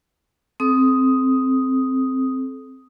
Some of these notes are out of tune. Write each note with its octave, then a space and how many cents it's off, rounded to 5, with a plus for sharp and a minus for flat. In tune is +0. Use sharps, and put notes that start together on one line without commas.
C4 +0 A4 -35 D#6 +5